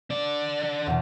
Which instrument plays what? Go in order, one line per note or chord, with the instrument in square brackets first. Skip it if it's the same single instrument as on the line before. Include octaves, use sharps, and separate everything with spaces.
[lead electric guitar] D3 D5
[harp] E2 B2